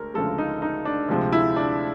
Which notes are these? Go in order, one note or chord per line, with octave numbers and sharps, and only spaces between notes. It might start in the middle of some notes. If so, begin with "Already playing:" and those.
Already playing: D2 G#3 A#4
D2 C#3 F3 G#3 A4
D#4
D#4
D4
D2 C3 F3 G#3
E4
D4